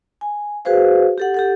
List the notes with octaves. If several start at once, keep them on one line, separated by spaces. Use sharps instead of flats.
G#5
F#4 G#4 B4 C5 F5
G4 A4 F#5
G4 A4 F#5